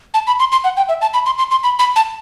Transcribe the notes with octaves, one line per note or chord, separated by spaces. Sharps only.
A5
B5
C6
C6
F#5
G5
E5
A5
B5
C6
C6
C6
B5
B5
A5